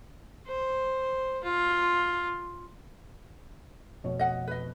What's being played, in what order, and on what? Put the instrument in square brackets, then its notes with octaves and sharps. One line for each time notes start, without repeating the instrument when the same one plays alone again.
[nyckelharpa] C5
F4
[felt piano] F1 B2 C#5
[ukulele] D#5 F#5
B4 D#5